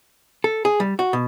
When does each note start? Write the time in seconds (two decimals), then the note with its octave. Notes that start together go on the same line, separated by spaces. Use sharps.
0.44 A4
0.65 G#4
0.80 G3
0.99 F#4
1.13 B2